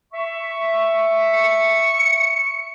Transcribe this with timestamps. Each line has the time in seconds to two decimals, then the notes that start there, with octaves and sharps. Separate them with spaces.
0.13 E5 C#6
1.33 C#7